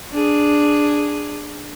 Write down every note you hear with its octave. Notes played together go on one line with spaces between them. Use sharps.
D4 G#4